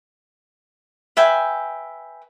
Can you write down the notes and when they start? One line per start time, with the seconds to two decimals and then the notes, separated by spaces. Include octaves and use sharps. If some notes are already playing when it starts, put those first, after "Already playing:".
1.17 B4 E5 G5 G#5